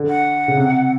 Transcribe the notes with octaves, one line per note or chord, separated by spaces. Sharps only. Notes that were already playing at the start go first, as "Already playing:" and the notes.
Already playing: D3
F#5
C#3
C3